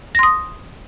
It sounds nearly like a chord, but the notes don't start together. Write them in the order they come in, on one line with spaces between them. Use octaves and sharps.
A#6 C6 D#6